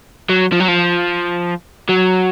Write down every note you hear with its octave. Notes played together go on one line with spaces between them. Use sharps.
F#3
F3
F#3
F3
F#3